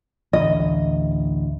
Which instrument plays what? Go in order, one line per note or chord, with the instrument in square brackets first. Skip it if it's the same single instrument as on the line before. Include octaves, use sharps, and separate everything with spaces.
[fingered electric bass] A1 D2 [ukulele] D#5